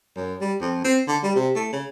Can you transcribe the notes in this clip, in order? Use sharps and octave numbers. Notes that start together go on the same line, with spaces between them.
F#2
G3
F2
C4
D3
G3
C3
A3
C#3